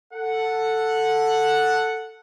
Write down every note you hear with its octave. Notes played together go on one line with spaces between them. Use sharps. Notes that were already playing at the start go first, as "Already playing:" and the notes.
A4 F#5